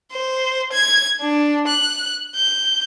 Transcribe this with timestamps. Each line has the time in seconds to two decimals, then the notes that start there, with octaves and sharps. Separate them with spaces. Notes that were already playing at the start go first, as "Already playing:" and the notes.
0.12 C5
0.72 G#6
1.21 D4
1.67 F#6
2.35 G6